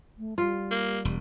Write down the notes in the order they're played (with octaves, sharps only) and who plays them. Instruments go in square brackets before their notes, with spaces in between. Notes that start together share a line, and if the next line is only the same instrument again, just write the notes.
[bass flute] A3
[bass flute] G3 [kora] F4
[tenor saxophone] A#3
[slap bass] E1